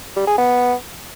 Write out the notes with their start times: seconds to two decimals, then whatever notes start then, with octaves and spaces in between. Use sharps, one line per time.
0.16 G3
0.27 G#4
0.38 B3